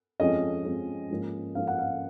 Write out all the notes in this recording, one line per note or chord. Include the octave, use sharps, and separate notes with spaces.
F2 F3 G#3 C#4 D#5
F2 F3 G#3 C#4
G#2 F3 A#3 C#4
G#2 F3 A#3 C#4 F5
F#5
F5